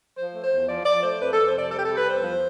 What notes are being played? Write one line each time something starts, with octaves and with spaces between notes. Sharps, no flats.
F3 C5
A3
C5
E2
F3 D5
F3 D5
A3 C5
F2 B4
F2 A4
C5
C3 D5
G3 A4
G4
G3 A4
B4
E2 C5
F3